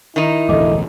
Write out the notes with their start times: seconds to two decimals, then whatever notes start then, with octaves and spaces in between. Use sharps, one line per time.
0.16 D#3 D#4 E4
0.49 E1 A1 D2 A4 D#5 D6